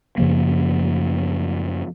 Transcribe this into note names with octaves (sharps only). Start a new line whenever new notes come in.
F#2 C#3 F3 A#3